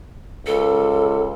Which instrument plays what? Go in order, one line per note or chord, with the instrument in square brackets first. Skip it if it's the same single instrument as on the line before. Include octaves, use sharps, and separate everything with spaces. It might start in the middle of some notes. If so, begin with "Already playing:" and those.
[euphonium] C#2 [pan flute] A4